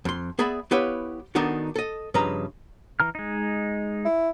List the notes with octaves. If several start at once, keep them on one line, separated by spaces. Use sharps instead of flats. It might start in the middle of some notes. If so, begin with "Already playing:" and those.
F2 C6
B3 G#4 D5 E5 B5
B3 E4 G4 B4 C#5 F5
D#3 B3 D4 D#4 F#4 A4
A4 D#5
G2 C#3 F3 B4 D#5 A#5
E3 A#5 F6
G#3 D#4
E4